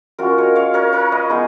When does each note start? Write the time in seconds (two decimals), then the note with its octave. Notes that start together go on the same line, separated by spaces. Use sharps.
0.18 G#3 C#4 F4 F#4 A#4
0.38 A#4 C#5
0.55 C#5 F5
0.74 A#4 C#5
0.93 A#4 C#5
1.12 B4 D#5
1.29 G#3 B3 D#4